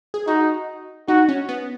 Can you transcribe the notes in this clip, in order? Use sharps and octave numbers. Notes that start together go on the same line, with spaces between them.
G#4
D#4 F#4
D#4 F#4
C#4
B3